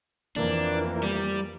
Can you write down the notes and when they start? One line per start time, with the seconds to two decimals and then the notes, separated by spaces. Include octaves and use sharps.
0.36 F2 E3 A#3 D4
1.03 G3